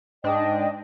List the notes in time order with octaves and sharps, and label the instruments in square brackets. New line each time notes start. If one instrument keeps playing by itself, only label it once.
[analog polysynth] G#2 D4 [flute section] D#5 G5